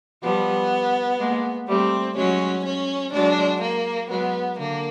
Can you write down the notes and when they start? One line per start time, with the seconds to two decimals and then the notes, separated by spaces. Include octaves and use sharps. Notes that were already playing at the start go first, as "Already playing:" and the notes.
0.23 F3 G3 B3
1.20 G#3 A#3
1.68 G3 A3 C4
2.16 F#3 G#3 C#4
2.65 C#4
3.13 F#3 G#3 D4
3.62 A#3
4.10 F#3 G#3 B3
4.59 D3 A#3